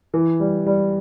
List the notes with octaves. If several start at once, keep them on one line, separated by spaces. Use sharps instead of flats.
E3
G3
G3